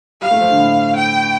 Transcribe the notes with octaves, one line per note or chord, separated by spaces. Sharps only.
G3 F5
A3
F3
D3
A2
G5